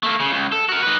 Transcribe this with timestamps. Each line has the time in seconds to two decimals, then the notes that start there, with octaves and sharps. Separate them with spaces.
0.03 A3 A#3
0.20 C#3
0.32 C#2
0.52 A4
0.69 F#4 A#4
0.82 D#4 B4